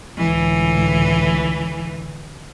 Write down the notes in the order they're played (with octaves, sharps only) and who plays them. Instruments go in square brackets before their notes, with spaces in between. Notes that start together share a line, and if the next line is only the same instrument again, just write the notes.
[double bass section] C#2 A2 D3 [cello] E3